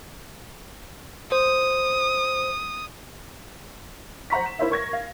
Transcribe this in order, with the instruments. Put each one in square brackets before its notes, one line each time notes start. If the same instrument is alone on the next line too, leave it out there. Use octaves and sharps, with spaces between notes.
[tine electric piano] C5 [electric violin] D#6
[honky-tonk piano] C5 F#5 A#5 C#6 B6
E7
E4 A#4 C5 C#5 E5 F5
A#4 C#6 G#6 A#6
F5